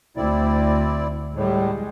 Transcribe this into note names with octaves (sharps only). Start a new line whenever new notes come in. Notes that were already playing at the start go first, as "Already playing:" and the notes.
D2 C4 E4 D5
A2 G3 G#3